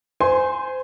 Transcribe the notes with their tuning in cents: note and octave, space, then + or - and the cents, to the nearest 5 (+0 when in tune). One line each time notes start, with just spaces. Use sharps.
C5 -25 G#5 +0 C6 +30